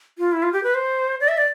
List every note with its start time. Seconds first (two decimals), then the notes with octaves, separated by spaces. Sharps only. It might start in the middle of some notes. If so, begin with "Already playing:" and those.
0.18 F4
0.33 E4
0.43 F4
0.53 G4
0.63 B4
0.75 C5
1.20 D5
1.28 E5
1.37 D5